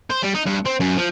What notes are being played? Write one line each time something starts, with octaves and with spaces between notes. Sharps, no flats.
C5
G3
D#4
G2
C4
F#2
F3